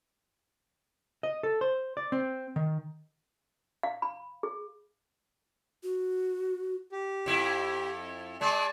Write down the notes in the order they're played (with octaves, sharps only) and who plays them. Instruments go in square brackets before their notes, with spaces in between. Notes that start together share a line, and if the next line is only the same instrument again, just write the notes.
[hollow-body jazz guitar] D#5
A4
C5
D5
C4
D#3
[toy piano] F5
B5
G#4
[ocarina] F#4
[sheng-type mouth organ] G4
[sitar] F2 E4
[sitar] G#3 G#4 [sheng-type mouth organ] D5 A5